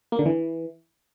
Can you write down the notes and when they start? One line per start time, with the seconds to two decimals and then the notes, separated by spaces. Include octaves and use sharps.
0.12 A#3
0.19 D3
0.26 E3